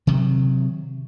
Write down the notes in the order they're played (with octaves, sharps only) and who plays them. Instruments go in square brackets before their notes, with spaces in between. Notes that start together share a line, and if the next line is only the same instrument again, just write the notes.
[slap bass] C3 D#3 F#3